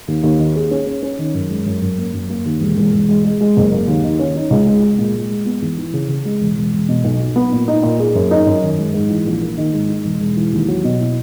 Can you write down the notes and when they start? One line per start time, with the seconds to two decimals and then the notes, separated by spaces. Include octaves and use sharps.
0.08 D#2
0.24 D#2
0.39 D#3
0.55 G#4
0.71 C#4
0.87 C#4
1.03 C#4
1.19 D#3
1.34 F#2
1.50 G#3
1.66 F#2
1.82 F#2
1.98 A#3
2.13 F#2
2.30 A#3
2.46 D#2
2.61 E1
2.77 E1
2.93 E1
3.09 G#3
3.25 G#3
3.41 G#3
3.56 F#1
3.72 A#3
3.88 D#2
4.04 D#3
4.19 C#4
4.35 D#4
4.50 C#2
4.67 G#3
4.83 G#3
4.98 A#2
5.14 G#3
5.30 G#3
5.46 B3
5.62 E2
5.78 E3
5.93 C#3
6.09 C#3
6.25 G#3
6.41 E1
6.56 E1
6.73 E1
6.89 B2
7.04 B1
7.20 F#3
7.36 B3
7.52 A#2
7.68 D#4
7.83 A#2
7.99 G#4
8.15 F#2
8.31 D#4
8.47 F#2
8.63 D#3
8.78 G#3
8.94 G#2
9.10 E3
9.25 A#1
9.42 A#3
9.58 D#3
9.73 G#2
9.89 D#4
10.04 E1
10.20 E1
10.37 E3
10.53 D#2
10.68 F#3
10.84 B2
11.00 E4